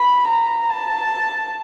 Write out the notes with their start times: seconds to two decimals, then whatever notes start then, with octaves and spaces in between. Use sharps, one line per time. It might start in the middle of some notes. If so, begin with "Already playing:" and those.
Already playing: B5
0.27 A#5
0.69 A5